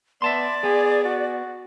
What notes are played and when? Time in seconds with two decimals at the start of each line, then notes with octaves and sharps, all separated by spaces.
0.22 B3 D5 E5 A5 C6
0.64 B3 G#4
1.05 F#4